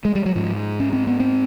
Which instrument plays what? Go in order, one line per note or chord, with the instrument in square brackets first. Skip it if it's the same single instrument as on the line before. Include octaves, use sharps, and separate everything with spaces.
[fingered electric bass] G#3
G3
F#3
G#2 F3
C#4
C4
B3
C4